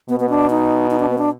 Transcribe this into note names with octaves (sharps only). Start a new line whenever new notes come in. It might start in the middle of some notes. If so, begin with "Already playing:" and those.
B2 B3
B3
D4
D#4
D#4
D4
B3
D4